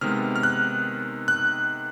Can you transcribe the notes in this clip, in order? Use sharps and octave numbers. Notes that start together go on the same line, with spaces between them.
C3 D#3 G#3 B3 F6
F6
F#6
F#6